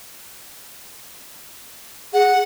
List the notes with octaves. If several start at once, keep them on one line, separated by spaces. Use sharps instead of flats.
G#4 F#5